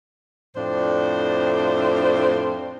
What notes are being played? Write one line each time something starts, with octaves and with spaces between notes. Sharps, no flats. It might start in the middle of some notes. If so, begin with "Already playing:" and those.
F2 A2 D4 C5